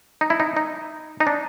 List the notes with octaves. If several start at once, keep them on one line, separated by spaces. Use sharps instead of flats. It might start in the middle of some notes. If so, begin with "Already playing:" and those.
D#4
E4
D#4
D#4
D#4
D4